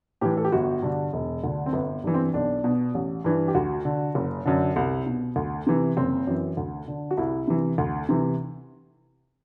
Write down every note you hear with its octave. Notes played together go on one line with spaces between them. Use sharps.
A2 E3 G4
A4
G4
G1 F#4
G2 D3
E1
D2 D3
C4
G1 B3
G2 E3
C4
B1 D4
B2
A1
G2 E3
G4
D2 F#4
D3
F#1
F#2 D3
C2
B2
D2
C3 E3
F#1 C4
F#2 E3
D2
D3
F#4
C2 E4
C3 E3
D2
C3 E3